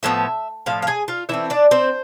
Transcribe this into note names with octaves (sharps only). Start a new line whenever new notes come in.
A2 F3 B3 E5
A2 F3 F5
F5
G#4 G#5
F4 F5
E3 A3 C4 E4 E5
D4 D5
C4 C5